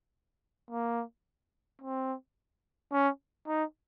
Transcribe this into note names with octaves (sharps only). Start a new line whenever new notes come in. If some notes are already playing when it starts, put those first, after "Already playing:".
A#3
C4
C#4
D#4